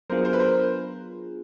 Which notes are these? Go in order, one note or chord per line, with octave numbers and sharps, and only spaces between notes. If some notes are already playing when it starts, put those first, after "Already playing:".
F#3 B3 D4 F4 G#4 A#4 C5
A#4 C5
B4
A#4 C5